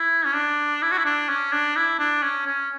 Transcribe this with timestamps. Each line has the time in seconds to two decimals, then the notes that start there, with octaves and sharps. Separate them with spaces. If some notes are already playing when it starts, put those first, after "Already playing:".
Already playing: E4
0.26 C#4
0.35 D4
0.82 E4
0.92 F#4
0.98 E4
1.05 D4
1.29 C#4
1.53 D4
1.76 E4
1.99 D4
2.23 C#4
2.46 C#4